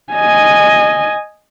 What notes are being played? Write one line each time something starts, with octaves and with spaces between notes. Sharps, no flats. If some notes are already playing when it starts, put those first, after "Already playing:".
D#5 G#5